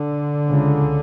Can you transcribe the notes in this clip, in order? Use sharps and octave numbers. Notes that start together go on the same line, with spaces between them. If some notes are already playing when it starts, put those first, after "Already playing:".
Already playing: D3
C#2 C#3